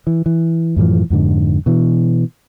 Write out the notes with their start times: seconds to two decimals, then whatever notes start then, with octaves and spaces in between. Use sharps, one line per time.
0.07 E3
0.26 E3
0.76 F#2 A2 E3 F3
1.10 F2 G#2 D3
1.66 B2 E3